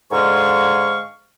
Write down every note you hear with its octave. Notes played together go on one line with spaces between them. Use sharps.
G#2 D3 G#3 F5 C#6